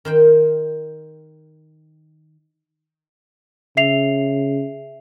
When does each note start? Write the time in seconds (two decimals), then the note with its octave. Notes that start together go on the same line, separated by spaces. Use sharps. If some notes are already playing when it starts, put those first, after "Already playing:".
0.05 D#3 C5 G5
3.77 C#3 E5 C7 F7